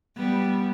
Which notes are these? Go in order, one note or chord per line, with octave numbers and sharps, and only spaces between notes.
G3 B3